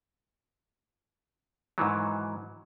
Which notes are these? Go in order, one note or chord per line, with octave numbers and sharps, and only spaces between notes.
G#2 D#3 E3 F#3